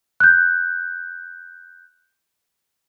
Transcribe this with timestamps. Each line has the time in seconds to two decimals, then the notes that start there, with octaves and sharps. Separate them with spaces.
0.20 F#6 G6